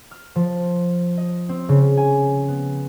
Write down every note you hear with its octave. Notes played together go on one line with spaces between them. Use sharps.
F6
F3
D#5
C4
C#3
G#5
B3